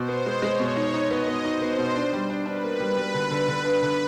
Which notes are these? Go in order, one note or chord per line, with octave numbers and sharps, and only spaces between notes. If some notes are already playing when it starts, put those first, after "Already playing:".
Already playing: B2 C5
B3
G#3
G#3 C#5
B2
D#4
D#4 D#5
B3
B3
D#4 C5
B3
B2
D4
G3
D4
D4 B4
A#3
G3
G3
D3
D3
D3
D4
D3